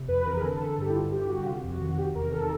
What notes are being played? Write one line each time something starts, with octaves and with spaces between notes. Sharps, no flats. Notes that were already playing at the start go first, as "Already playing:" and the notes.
Already playing: C3
F2 B4
E3 A#4
G#4
D3 A4
A4
D3
A4
G2 G4
E4
D3 F4
D3 G4
G2 F#4
C3 F4
F2
F#4
D#3
C3 G4
E2 A#4
D#3 A4